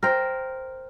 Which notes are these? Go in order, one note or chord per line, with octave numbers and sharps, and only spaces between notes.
A#4 C5 G5